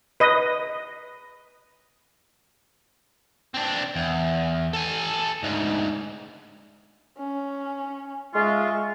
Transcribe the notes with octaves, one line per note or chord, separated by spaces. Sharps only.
B4 D#5
C4 D4
E2
A4 G#5
D2 G#2
C#4
G#3 F4 E5 C#6